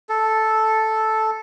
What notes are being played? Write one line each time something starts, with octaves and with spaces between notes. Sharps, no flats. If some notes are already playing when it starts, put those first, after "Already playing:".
A4